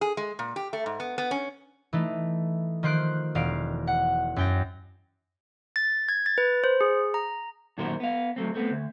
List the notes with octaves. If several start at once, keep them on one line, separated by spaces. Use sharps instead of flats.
G#4
G#3
A#2
G4
A3
G#2
B3
B3
C#4
E3 A3 D#4
D#3 F3 C5 C6 F#6 D7
E1 F5 D7
F#5
F#2 G5 A#6
A6
G#6
A6
B4
C5
G#4
A#5
F#2 A#2 D#3 F#4 A#4 C5
B3 F5
F#3 A3 C4
A3 B3 C4
D2